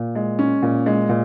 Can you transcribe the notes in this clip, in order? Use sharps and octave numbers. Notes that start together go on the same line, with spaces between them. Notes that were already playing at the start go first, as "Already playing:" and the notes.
Already playing: A#2
G#3
C#4
A#2
G#3
A#2